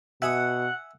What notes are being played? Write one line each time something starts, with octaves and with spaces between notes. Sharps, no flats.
B2 E5 F#5 G#5 D#6